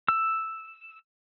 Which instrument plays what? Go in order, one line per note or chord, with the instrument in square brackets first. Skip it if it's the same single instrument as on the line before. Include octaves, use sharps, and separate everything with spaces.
[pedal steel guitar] E6